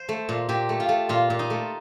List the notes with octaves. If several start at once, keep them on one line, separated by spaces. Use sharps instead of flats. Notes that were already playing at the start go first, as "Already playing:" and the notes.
Already playing: C5
A3
A#2
A#2 G4
A3
F4
A3
A#2 F4
A#2
D#4
A3